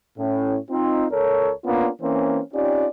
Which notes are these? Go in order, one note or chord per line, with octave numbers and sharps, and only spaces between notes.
A2 C#4
C4 D#4 F4
C#2 A4 A#4 C#5
A#3 B3 C#4 D4 F4
E3 A#3 C4 C#4
C4 C#4 D#4 F4 G4 D5